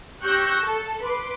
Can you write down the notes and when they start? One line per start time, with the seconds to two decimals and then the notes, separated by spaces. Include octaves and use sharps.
0.22 G4 C#6 E6 F#6 G6 A#6
0.61 A4
1.02 B4 C6 D6